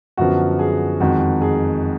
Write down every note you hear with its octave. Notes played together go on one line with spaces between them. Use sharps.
F#2 D3 F3 B3 F#4
G#4
F2 D#3 G#3 D#4 F#4
G#4